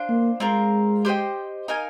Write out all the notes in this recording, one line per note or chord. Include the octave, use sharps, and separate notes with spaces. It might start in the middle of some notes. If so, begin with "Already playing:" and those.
Already playing: D4 F4 C5
A#3
G#3 C4 F4 A#4
G4 C5 D#5 G5
D#4 A#4 F5 G#5